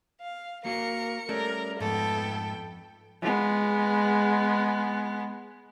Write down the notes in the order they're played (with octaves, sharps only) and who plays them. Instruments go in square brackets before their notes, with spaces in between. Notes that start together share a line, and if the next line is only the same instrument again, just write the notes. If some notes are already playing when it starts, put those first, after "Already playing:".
[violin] F5
[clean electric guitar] A#3 F#4 F5 [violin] A#4 C#7
[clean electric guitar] G3 D5 [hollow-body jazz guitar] A3 C#4 [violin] A#4
[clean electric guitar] F2 [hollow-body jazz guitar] G#2 [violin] A3 G5 [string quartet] B3 A4
[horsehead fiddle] G#3 B3